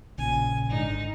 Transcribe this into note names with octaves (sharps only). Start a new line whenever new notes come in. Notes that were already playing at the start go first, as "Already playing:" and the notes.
A#1 A#2 C#3 G#5
G#1 G#2 D3 D#4